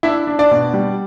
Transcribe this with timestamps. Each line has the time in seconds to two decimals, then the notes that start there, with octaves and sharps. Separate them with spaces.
0.03 D4 E4 E5
0.27 D4
0.39 D4 D5
0.51 B2
0.74 G3